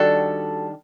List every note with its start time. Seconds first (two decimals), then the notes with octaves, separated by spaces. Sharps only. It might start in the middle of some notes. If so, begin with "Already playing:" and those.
Already playing: D#3 G3 D4 F#4 A4